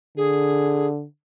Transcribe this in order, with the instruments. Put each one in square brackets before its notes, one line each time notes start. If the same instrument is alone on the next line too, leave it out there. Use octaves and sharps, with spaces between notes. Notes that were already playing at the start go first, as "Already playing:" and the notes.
[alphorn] D3 [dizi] G#4